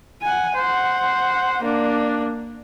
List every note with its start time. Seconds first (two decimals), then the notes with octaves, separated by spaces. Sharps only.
0.22 F#5 G#5
0.55 C5 F#5
1.62 A#3 D4